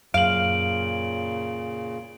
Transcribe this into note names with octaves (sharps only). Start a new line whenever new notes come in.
F#2 A#2 C#3 F5 D7 F#7